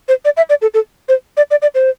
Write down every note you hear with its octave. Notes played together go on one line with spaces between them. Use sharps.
C5
D5
E5
D5
A4
A4
C5
D5
D5
D5
C5